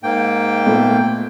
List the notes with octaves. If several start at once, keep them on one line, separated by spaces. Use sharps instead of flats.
G#2 A#3 G5
A#2 A3 B3